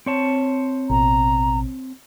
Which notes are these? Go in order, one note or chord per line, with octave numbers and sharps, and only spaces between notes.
C4 C#5 A5
A1 B2 A#5